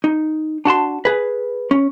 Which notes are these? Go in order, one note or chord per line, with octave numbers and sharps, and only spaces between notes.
D#4
D4 F#4 A5 C6
G#4 B4
C#4